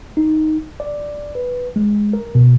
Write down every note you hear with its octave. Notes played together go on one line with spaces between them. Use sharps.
D#4
D5
B4
G#3
A#4
B2